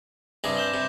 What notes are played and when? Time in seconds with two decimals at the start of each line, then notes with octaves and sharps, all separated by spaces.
0.44 G2 C3 G#4 D6 A#6
0.57 G6 E7 G7
0.74 C3